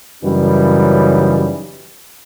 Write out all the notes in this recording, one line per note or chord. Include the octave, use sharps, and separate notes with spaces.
F#2 C#3 E3 G3 C#4 D#4